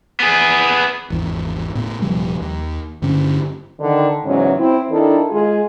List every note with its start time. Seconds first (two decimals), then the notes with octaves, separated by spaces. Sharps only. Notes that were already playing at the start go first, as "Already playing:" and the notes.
0.20 B3 G#4
1.10 G#1 E2
1.75 A2 B3
2.02 D#1 C3 F3 G3
2.41 D#2
3.02 G2 D3 C#4
3.81 D3 D#3
4.24 E2 G#2 C#3 F#3 C#4
4.58 C4 E4
4.91 D#3 D4 E4 A4
5.30 G#3 F4 G#4